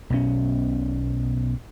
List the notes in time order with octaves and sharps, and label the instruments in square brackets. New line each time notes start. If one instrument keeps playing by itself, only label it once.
[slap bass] B1 B2 C#4